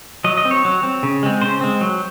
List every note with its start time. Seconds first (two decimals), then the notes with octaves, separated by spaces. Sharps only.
0.24 F#3 D#5
0.38 D#5
0.45 C4
0.51 C#5
0.65 F#3
0.83 C4
1.03 C#3
1.23 G#3 C4
1.42 C#3 C5
1.61 G#3 C4
1.81 F#3